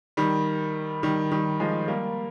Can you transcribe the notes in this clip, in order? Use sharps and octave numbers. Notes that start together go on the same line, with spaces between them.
D#3 G3
D#3 G3
D#3 G3
F3 G#3
G3 A#3